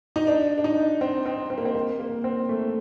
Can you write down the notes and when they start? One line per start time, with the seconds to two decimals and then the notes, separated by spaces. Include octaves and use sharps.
0.16 D#4
0.27 D4
0.58 D4
0.64 D#4
1.01 C4
1.26 C4
1.50 C4
1.58 A#3
1.65 C4
1.75 A#3
1.99 A#3
2.24 C4
2.49 A3